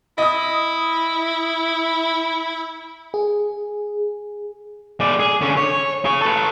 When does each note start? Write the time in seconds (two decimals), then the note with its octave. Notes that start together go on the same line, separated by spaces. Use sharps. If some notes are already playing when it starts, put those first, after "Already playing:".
0.18 E4 D#5 D#6
3.14 G#4
5.00 G#3 D5
5.20 G#4
5.41 D3 C#4
5.57 C#5
6.05 G#4 C#5
6.21 A4 B4